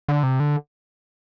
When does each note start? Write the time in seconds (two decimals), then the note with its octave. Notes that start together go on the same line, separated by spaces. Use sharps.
0.08 D3
0.23 C3
0.40 D3